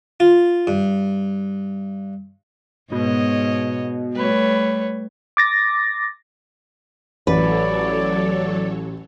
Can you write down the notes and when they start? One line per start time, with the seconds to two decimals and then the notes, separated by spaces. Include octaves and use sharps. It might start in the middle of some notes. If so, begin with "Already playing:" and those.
0.20 F4
0.67 G2
2.92 G#2 B2 C#5 D#5
4.15 G3 A3 B4 C#5
5.37 D6 A6 A#6
7.27 A1 F#3 A4 B4 C#5 D5